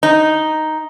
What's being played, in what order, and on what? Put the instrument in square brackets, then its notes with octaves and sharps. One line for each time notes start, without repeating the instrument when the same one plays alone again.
[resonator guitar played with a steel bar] D#4